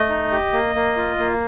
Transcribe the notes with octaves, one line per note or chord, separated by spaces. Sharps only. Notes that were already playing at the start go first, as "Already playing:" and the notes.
Already playing: A3 D#5
D#4
G4
A#3
A#3
F4
A#3